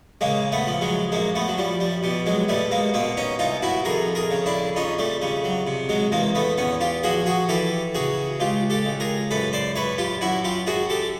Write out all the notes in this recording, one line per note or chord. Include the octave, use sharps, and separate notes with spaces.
C#3 G#3 A#3
A3 B3
F3
F#3 G#3
F#2 G#3 A#3
A3 B3
F#3
F3 G3
G3
B2 G3
F#3 G#3
B2 G3 A3
G#3 A#3
B2 A#3 C4
C#4 D#4
C2 D#4 F4
E4 F#4
F2 G#4 A#4
G#4 A#4
C#3
D4 E4
F2 C#4 D#4
G3 A3
C#3 G3
F#3
C3
F#3 G#3
E2 G#3 A#3
A3 B3
E2 B3 C#4
F4 G4
F3 F#4 G#4
F#4 G#4
E3 G4 A4
C#3 F#4 G#4
C#2 F4 G4
G4 A4
C#2
G#4 A#4
F#2 A4 B4
C5 D5
F#2 B4 C#5
F4 G4
F#2 E4 F#4
F4 G4
F#2 F#4 G#4
G4 A4